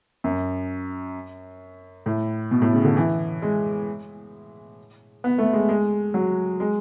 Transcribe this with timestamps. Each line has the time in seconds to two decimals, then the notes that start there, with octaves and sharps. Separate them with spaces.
0.24 F#2
2.06 A2
2.51 B2
2.62 A2
2.73 C#3
2.85 D3
2.97 E3
3.42 G#3
5.24 B3
5.38 A3
5.53 G#3
5.69 G#3
6.14 F#3
6.60 G#3